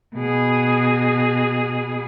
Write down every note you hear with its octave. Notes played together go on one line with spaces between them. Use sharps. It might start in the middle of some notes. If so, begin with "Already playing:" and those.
B2 G#4